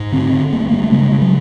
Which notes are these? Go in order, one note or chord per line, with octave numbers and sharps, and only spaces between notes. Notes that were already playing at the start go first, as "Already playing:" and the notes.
Already playing: G#2
D3 C4
D3
G2 A#3
A3
G2 A#3
A3
C#3 G#3
C#3
F#3